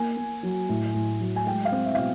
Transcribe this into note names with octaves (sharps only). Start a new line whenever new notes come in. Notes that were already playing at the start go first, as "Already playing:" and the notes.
Already playing: A#3 G#5
A#3
F#3
A2
A2
F#3
G#5
G#3 G5
F5
C4
E5
B2 F5